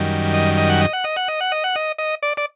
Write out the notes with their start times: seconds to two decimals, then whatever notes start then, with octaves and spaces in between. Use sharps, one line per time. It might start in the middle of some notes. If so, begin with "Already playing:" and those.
Already playing: F#2 D#3 G3
0.34 D#5
0.57 D#5
0.70 F#5
0.81 D#5
0.93 F#5
1.04 D#5
1.16 F#5
1.28 D#5
1.41 F#5
1.52 D#5
1.64 F#5
1.76 D#5
1.98 D#5
2.23 D5
2.37 D5